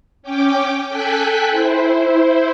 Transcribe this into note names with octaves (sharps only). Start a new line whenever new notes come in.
C#4 G5 D6
A4 G5 G#5 F#6 B6
E4 C5